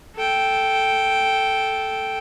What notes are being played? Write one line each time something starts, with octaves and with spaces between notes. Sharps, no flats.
A4 G5